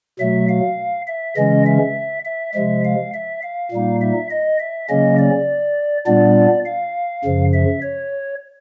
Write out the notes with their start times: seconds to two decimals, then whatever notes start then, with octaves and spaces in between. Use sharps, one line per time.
0.19 B2 F#3 A3 E5
0.48 F5
1.07 E5
1.36 C#3 E3 G#3 C#4 D#5
1.66 E5
2.25 E5
2.54 C3 F3 G#3 E5
2.84 F5
3.14 E5
3.42 F5
3.72 A#2 G3 A#3 D#4
4.01 E5
4.31 D#5
4.59 E5
4.89 C#3 F#3 A#3 C#4 D#5
5.18 D5
6.06 A#2 G3 B3 D4 D5
6.65 F5
7.25 F#2 C#3 F3
7.53 E5
7.82 C#5